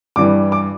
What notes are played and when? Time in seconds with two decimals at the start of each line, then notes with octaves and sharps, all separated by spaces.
0.16 G2 E3 G3 D6
0.52 D6